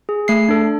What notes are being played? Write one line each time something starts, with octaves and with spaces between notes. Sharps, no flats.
G#4
A3 C7
D4 A4